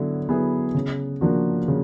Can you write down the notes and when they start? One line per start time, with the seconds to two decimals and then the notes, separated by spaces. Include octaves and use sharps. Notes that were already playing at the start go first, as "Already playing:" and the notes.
Already playing: D3 F#3 B3 E4
0.28 F#3 B3 E4 G#4
0.74 C#3
1.21 F3 A#3 D4 F#4
1.68 C#3